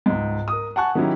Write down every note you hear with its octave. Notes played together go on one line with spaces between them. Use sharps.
C#2 G#2
A#4 D#6
F#5 G#5 A5 C#6 F#6
D#3 F#3 C#4 D#4 E4 G4